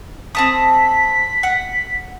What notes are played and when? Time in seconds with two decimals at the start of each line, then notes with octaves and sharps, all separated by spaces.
0.35 C4 A5 D#6 B6
1.43 F#5